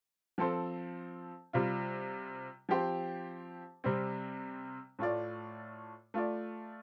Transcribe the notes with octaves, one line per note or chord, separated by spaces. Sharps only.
F3 C4 A4 C5
C3 G3 F4
F3 C4 G4 C5
C3 G3 C4
A2 A3 F4 D5
A3 F4 D5